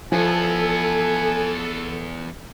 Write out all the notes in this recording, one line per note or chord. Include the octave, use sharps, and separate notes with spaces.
E2 F3 B3 A4 G#5